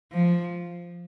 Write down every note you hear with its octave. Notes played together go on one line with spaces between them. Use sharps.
F3